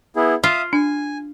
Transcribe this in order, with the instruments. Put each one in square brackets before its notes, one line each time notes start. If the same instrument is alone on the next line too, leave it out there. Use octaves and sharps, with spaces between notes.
[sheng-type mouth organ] B3 E4 G#4
[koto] F4 [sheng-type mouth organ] E5 F5 D#6
[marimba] D4 [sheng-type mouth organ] G#5